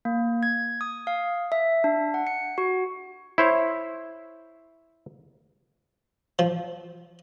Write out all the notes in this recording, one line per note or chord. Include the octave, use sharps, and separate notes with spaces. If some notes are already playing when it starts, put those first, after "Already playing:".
A#3
G#6
D#6
F5
E5
D4
F#5
C#7
F#4
E4 C5 C#5
F3